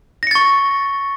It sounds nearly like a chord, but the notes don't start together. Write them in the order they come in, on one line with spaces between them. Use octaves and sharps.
A#6 C#7 A6 C#6